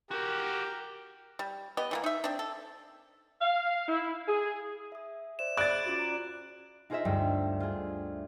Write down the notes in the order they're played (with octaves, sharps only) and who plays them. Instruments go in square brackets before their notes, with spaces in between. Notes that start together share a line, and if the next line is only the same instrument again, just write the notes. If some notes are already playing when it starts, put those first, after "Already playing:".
[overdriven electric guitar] F#4 G5 [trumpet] G4 [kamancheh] A#4
[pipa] G3
B3 G4 D#5
E3 G3 A#3
D#4 E5
C4 D4
A4
[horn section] F5
E4
G#4
[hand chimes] E5 D#6
[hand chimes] C5 D5 E5 [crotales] E7
[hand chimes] G#4 B5 G#6 [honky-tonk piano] D5 A6 [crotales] F#6 D7
[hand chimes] C#4 F4 F#4
A#5
[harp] D#4 F4 G#4 C5 D#5 E5
D2 G2 G3
F4 G#4